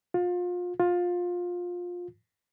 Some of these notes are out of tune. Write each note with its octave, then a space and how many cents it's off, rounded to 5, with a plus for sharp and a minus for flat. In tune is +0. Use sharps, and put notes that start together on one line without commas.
F4 +30
F4 +20